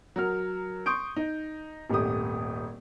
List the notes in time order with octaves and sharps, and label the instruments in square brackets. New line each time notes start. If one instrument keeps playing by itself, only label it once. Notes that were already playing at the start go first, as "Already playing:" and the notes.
[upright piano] F#3 A#4 F6
C6 C#6 D#6 G6 D7
D#4
D#1 G#1 A3 G4 D#6